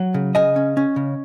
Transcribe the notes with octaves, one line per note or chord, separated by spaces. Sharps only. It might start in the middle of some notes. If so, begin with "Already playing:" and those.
Already playing: F#3 C#5
C#3
C#3 D#5 G#5
C#4
C#4
C#3